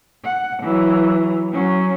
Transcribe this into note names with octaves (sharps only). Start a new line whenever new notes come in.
F#5
E3 F#3
F#3 C#4